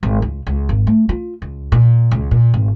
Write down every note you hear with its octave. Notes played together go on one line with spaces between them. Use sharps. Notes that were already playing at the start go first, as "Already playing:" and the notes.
G#1
C#2
C#2
G#1
A3
F4
C#2
A#2
C#2
A#2
G#1